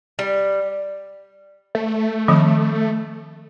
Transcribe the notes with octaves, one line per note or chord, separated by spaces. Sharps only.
G3
A3
D#3 F3 C4